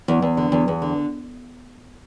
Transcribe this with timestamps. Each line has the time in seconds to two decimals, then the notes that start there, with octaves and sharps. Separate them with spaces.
0.08 E2
0.22 E2
0.37 D3
0.52 E2
0.68 E2
0.82 D3